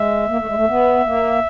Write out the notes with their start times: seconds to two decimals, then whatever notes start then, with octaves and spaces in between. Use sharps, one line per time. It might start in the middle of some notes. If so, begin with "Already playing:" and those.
Already playing: G#3 E5
0.28 A#3
0.38 A3
0.46 G#3
0.56 A3
0.68 B3
1.05 A#3